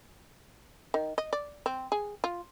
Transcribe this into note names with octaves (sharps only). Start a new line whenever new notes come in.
D#3
D#5
D5
C4
G#4
F4